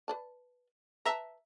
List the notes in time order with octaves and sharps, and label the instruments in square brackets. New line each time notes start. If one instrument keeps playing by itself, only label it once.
[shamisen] B4 D5 A5
[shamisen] B4 A5 [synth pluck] E5 A#5